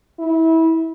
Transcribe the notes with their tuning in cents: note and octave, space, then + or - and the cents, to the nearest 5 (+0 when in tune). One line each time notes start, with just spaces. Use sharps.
E4 -25